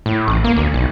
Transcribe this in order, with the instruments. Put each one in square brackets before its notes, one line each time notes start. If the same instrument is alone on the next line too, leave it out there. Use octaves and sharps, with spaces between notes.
[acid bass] A2
A1
A#3
D2
B1